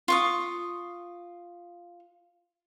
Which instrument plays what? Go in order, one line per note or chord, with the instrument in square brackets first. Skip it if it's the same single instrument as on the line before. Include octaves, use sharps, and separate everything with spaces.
[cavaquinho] F4 C#6 D#6